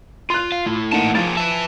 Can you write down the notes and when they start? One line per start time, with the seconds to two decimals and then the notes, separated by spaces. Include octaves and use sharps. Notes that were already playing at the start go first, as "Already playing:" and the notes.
0.30 F4 C6 F#6
0.52 F5
0.66 A3 E4
0.92 E3 A#3 D#4 F#5 A5
1.15 F3 A#3 F4 G#4 A6
1.37 B4 E5 A5